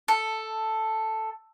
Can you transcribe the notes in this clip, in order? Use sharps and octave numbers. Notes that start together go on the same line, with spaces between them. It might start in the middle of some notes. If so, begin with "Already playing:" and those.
A4